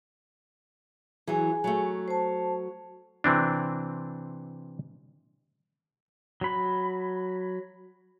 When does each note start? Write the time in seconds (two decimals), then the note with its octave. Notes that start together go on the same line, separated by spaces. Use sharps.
1.28 E3 F#3 G#4 G#5
1.64 F#3 A3
2.08 C5 A5
3.24 C3 E3 C4 D4
6.41 F#3 B5